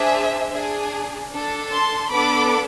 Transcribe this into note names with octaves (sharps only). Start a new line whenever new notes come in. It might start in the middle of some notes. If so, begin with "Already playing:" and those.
Already playing: D4 G#4 C5 E5
D4 G#4
D4 A4
A5 C6
B3 D4 A4 B5 D6